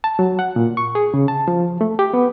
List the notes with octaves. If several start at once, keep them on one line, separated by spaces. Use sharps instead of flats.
A5
F#3
F#5
A#2
C#6
G#4
C#3
A5
F3
A3
G4
B3